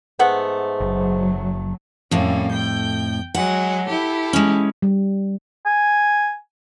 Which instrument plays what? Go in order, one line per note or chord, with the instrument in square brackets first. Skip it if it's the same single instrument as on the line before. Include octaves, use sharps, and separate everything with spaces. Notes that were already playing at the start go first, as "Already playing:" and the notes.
[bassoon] G#2 [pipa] A3 B3 F#5
[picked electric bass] F#1 [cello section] F#3
[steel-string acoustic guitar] F2 A2 [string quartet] G3 A#3 C#4
[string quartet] G5 G6
[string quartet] F#3 G#3 F#4 [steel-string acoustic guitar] F#5
[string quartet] E4 G4 A4
[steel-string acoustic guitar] G#3 C#4
[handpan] G3
[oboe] G#5